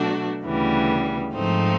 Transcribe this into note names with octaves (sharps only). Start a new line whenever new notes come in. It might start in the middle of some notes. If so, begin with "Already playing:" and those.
Already playing: B2 F#3 A3 D4 F#4
D2 C#3 E3 G3 B3
G#2 F3 A3 C4 D#4